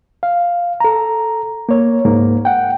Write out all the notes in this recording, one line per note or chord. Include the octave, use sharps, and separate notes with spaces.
F5
A4 A#5
A#3 C#5
C#2 G#2 A#3
F#5 G5